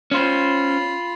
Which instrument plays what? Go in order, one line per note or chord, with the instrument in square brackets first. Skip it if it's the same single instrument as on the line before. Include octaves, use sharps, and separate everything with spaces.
[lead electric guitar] C#4 C5 [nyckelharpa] F4 B5